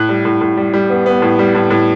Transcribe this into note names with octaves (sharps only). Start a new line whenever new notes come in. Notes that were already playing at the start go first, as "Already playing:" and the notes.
Already playing: A2 F#6
G3
A2
A2
G3
G3
B3
B3
A2
G3
A2
A2